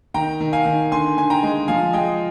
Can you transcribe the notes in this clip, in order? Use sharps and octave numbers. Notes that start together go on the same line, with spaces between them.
D#3 G5 A#5
D#3
F5 G#5
D#3
D3 G#5 C6
D3 G#5
G5 A#5
G#3
F3 F5 G#5
G#3 D#5 G5